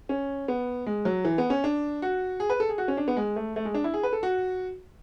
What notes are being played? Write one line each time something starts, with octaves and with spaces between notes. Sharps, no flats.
C#4
B3
G#3
F#3
E3
B3
C#4
D4
F#4
G#4
B4
A4
G#4
F#4
C#4
D4
B3
G#3
A3
A3
G#3
D4
E4
G#4
B4
A4
F#4